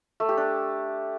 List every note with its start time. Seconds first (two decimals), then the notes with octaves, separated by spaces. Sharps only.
0.20 A3
0.29 G4
0.37 D4